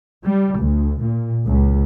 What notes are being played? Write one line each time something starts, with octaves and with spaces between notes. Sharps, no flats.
G3
D2
A#2
C#2